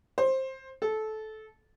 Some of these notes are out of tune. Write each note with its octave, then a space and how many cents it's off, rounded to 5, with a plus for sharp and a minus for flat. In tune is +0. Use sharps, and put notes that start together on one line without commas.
C5 +15
A4 -20